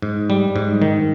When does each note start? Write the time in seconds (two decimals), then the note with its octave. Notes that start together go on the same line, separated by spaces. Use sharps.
0.02 G#2
0.30 G3
0.56 G#2
0.82 D#3